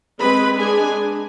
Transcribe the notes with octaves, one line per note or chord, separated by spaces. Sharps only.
G#3 C4 B4 B5
G#3 D4 G#4 G#5